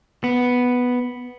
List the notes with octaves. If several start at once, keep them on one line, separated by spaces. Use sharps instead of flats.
B3